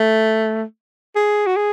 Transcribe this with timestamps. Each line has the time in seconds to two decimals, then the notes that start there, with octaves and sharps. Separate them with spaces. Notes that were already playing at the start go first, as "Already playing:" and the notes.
Already playing: A3
1.16 G#4
1.47 F#4
1.56 G#4